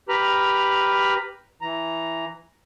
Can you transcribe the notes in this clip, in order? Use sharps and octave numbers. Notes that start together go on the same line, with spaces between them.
G4 B4 A#5 B5 F6
E3 A#5